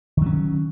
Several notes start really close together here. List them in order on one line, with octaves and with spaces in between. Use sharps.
D#3 F#3 C#4